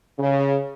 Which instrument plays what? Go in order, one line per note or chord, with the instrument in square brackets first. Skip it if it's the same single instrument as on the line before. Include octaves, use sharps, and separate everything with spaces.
[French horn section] C#3